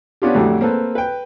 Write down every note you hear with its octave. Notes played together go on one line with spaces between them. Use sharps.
B3 C#4 D4 F4 G4
F2 A2 D3 F#3 G3
A#3 C4 A4 B4
B4 G5